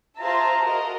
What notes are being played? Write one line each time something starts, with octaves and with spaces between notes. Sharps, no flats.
F4 G#4 C5 E5 A5 A#5
F#4 A#4 D#5